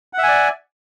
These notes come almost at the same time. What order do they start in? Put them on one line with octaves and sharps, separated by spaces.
F#5 E5 G#5 D5